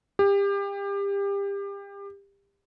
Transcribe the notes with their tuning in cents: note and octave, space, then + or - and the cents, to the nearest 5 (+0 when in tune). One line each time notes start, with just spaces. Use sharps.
G4 +30